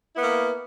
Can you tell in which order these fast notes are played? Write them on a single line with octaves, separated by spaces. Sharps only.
E4 B3 A#3